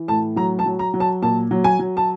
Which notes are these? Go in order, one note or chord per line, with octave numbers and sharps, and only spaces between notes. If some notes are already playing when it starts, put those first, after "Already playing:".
Already playing: E3
A2 A5
F#3 A#5
A5
F#3
A#5
F#3
A5
A#2 A5
F#3
G#5
F#3
A5